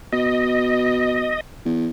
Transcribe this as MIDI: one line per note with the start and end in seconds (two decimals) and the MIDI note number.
0.12 1.37 47
0.12 1.41 75
1.66 1.89 40